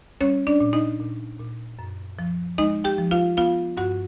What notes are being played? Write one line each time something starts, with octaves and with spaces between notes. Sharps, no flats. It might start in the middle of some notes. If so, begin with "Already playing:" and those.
G3 C#4 C#5
D4 D5
A#2
D#4 D#5
A#2
A#2
F#2
F3
G#3 D#4 D#5
G4 G5
F3
F4 F5
B3 F4 F5
G2 F#4 F#5